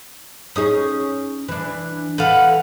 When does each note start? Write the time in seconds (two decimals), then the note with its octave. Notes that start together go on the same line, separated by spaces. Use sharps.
0.56 C#4 D#4 G#4 D#6
1.48 E3 D4
2.18 E3 A4 B4 F5 F#5